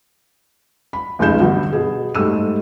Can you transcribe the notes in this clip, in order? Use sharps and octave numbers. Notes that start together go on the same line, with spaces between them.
B5
F1 C#2 D#4 G#4 G6 E7
G2 D3 F#3 B3
B2 G#4
G#2 G3 A3 E6 D#7